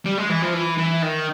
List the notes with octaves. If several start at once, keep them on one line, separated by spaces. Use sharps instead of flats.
G3
G#3
E3
F3
E3
E3
D#3